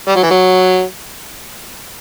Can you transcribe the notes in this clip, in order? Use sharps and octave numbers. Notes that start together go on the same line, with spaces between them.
G3
F#3
E3
F#3